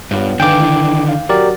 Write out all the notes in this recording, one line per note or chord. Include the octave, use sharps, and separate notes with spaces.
G2 B3 F4 C#5
D3 D#3 B4 F5 G5 G#5 D6
E3 E4
F5
F#3 F#4 G4 A#4 D5